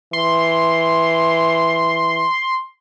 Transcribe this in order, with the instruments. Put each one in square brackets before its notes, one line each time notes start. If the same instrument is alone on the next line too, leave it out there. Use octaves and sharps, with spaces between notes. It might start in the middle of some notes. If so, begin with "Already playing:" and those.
[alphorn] E3 [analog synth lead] C6